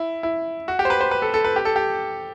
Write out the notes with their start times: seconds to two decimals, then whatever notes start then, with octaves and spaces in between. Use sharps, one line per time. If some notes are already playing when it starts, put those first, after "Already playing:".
Already playing: E4
0.23 E4
0.68 F#4
0.79 G4
0.85 C5
0.90 B4
1.01 C5
1.11 B4
1.22 A4
1.34 A4
1.45 B4
1.56 G4
1.65 A4
1.76 G4